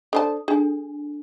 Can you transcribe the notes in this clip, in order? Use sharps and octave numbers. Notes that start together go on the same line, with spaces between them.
D4 A4 C5 A5
D4 G#4 G#5